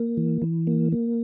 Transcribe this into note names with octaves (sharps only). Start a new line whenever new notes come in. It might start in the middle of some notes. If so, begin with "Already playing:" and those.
Already playing: A#3
E3
E3
A#3
A#3